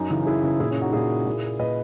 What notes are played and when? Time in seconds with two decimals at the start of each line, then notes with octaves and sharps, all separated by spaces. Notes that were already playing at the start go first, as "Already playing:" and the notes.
Already playing: F#2 D#4
0.10 C#3 E3
0.26 F#2 E4 G#4
0.43 C#3 E3
0.60 A#2 E4 G#4
0.71 C#4 E4
0.81 D#4 F#4
0.93 A#2 E4 G#4
1.27 A#2
1.59 A#2 B4 D#5